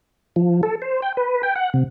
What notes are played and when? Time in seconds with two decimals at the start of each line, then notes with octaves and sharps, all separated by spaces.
0.36 F3
0.63 A4
0.82 C5
1.02 G5
1.17 B4
1.43 G5
1.56 F#5
1.74 C3